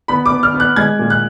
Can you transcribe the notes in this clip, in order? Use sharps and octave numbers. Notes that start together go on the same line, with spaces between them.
B3 B5
D6
B3
F6
B3
F#6
G#3 G#6
A#2
F#6